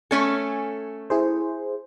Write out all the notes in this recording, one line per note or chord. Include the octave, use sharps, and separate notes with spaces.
A3 C#4 A4 G#5
E4 G#4 C5